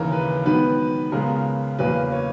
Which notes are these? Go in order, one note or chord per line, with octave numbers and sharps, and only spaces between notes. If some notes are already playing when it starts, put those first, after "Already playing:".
Already playing: D#2 C#3 E3 A#4
B4
G#2 D#3 F#3 B3 B4
C#2 C#3 G#3 B3 A#4
E2 C#3 F#3 A#3 C#4 B4
C#5